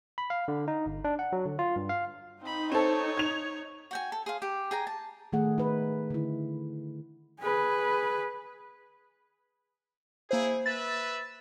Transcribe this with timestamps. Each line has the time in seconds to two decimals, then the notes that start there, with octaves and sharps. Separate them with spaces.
0.18 B5
0.30 F5
0.48 D3
0.68 D#4
0.86 G1
1.04 D4
1.19 F#5
1.33 F#3
1.46 D3
1.59 F4
1.76 G2
1.89 F5
2.42 C4 D#4 B5
2.72 C4 A4 C#5
3.17 G#6 F7
3.91 F#4 G5 G#5
4.12 A4
4.26 G#4 C5 F5
4.42 G4
4.71 G#4 G5 G#5 A#5
4.87 A5
5.33 D#3 A3 G#4 F#5
5.58 D#4 B4
6.10 D3 E4
7.40 G#4 B4
10.31 A#3 E4 G#4 C5
10.66 B4 E5 A6